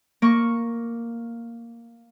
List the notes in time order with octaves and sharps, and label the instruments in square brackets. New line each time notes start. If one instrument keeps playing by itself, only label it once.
[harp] A#3 C#6